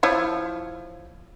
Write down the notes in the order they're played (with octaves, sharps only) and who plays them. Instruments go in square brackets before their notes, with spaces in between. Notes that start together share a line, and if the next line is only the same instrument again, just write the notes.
[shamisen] F3 E4 C#5